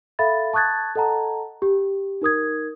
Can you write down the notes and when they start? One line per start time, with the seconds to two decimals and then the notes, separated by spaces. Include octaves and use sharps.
0.19 A4 E5 F5 B5 A6
0.53 A5 C#6 D#6 F#6 G#6 A6
0.95 A4 D#5 F#5 A5 A#5
1.62 G4
2.22 D#4 A#4 D#6 G#6